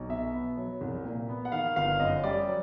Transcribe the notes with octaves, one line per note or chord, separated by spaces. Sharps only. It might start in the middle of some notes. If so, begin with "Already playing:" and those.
Already playing: B1
B2 E5
B3
F#3
C2
A#2
B3
F#5
D#3 F5
G1 F5
F#2 D#5
G3 D5
F#3